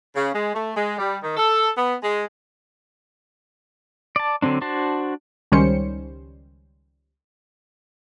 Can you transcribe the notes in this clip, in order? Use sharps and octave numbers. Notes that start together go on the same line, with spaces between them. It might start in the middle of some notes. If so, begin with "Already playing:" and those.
C#3
G#3
A3
G#3
G3
D#3
A4
B3
G#3
D5 A5
D3 F#3 C4 D4
D4 F#4 C5 A5
C#2 D#3 G3 C#4 C5 C#7